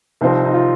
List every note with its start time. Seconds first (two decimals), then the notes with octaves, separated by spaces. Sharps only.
0.21 C2 C3 F3 C4 D#4
0.45 D#4
0.54 F4